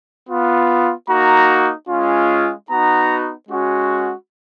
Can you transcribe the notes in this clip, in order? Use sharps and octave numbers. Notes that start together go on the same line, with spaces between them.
B3 F4
A#3 D#4 F#4 A#5
G#3 C#4 F4
B3 D#4 F#4 A#5
G#3 C#4 F#4